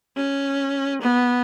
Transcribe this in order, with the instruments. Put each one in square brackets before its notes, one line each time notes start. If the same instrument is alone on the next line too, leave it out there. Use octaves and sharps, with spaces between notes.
[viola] C#4
B3